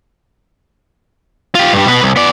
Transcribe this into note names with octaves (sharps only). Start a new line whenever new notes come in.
F4 G4
G2 G3
B2 B4
C2
B3 D5